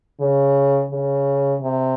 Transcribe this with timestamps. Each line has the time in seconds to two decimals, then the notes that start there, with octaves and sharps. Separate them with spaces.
0.20 C#3
0.91 C#3
1.61 C3